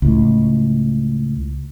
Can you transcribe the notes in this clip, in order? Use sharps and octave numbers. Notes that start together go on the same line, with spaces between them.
C#2 A2